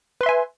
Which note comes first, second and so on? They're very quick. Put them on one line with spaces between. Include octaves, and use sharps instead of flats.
B4 C6 E5 G#5